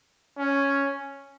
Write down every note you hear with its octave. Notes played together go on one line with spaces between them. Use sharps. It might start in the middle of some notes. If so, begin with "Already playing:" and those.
C#4